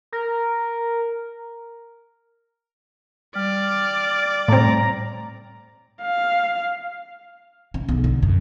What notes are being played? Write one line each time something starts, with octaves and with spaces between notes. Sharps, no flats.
A#4
G3 D5 F6
A2 C4 A#5
F5
C#3
B1
D3
F#2